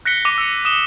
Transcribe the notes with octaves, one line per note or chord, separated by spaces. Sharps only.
F#6 A#6 B6 C#7 G7
D6 A#6 D#7
E6 C#7
D#6 E7 G7